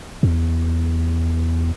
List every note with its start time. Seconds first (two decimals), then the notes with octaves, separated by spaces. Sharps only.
0.23 E2